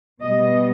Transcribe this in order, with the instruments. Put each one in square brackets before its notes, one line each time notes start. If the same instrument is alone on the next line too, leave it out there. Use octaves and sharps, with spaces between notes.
[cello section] B2 G3 B3 D#5